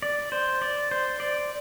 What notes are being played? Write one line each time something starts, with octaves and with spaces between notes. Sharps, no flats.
D5
C5
D5
C5
D5